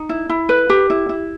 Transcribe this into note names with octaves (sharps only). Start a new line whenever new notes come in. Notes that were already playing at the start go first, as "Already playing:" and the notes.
Already playing: D#4
E4
E4
B4
G4
E4
E4